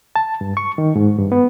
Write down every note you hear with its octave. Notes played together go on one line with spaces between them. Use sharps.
A5
G2
C#6
D#3
G#2
G2
B3